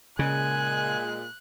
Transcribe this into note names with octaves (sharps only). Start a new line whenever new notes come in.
A#2 C#3 G#3 G#5 F#6